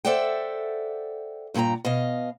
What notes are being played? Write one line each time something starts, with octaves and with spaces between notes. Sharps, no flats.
A4 C5 D5 E5 F#5 G5
G2 A#2 A4 G5 A#5
B2 D#5 F5